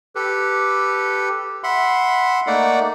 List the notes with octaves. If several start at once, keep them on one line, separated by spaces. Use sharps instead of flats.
G4 A4 B4
E5 F#5 B5 C6
A3 A#3 D#4 D5 F#5